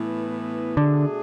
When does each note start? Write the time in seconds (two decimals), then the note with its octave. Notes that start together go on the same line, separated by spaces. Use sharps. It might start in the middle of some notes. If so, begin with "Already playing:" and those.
Already playing: A2 E3 B3
0.77 B2 D3 A3 D4 G#4